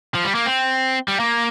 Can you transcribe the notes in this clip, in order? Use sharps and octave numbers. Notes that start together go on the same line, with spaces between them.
F3
G3
A#3
C4
G3
A#3